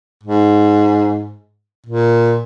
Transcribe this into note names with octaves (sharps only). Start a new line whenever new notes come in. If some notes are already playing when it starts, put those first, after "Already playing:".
G#2
A#2